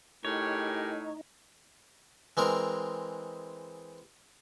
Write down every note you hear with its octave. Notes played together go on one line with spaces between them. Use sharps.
A2 D#4 G4 G#4 A#4 C#5
E3 G#3 C4 A#4